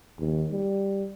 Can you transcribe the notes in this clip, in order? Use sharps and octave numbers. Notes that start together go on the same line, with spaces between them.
D#2
G3